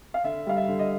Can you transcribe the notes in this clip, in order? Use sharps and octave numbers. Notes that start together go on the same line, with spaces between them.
F5
D3 E5
G3 F5
E5
D3
D#5